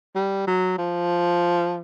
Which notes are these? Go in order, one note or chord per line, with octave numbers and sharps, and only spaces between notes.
G3
F#3
F3